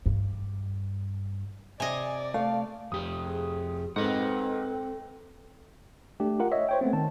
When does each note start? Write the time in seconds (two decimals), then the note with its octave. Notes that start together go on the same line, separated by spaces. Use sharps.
0.06 G2
1.80 C3 D5 D#5 G#5
2.34 A3 F5
2.92 F2 G4 D#6
3.25 G#4
3.96 G#2 C4 A4 B4 D#5 F#5
6.20 A3 D4 G4
6.39 F4 A#4 F#5
6.52 C#5 D#5 E5
6.69 C5 C#5 G5
6.81 A3 B3 C4
6.93 D#3 A5